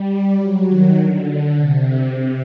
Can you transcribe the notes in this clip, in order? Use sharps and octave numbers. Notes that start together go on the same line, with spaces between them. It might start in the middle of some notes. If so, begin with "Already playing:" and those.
Already playing: G3
F#3
D#3
D3
D3
C3